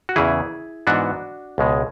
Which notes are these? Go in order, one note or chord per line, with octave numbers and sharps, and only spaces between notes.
F#4
E2 C#3 E3 E4 G#4
G#2 E3 B3 D4 F#4
C#2 B2 G#3